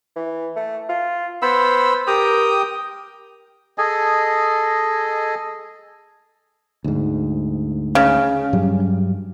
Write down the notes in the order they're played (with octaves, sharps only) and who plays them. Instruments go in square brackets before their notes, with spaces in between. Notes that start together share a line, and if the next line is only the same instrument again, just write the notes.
[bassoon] E3
A3
F4
[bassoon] B3 [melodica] C5 B5 E6
[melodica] G4 G5 D#6 [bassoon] A#4
[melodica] G#4 A4 D#5 G#5
[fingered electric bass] D2 G#2
[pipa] C#3
[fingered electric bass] G2 F#3 G3